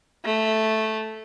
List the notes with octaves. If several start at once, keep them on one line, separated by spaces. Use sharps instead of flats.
A3